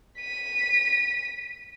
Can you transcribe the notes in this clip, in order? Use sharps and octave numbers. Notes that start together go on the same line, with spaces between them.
B6 D#7